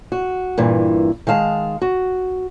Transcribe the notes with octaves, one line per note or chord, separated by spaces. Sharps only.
F#4
G2 A#2 E3
D#3 G#3 F5 A5
F#4